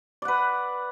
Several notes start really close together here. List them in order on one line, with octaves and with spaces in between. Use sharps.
D5 F#5 B4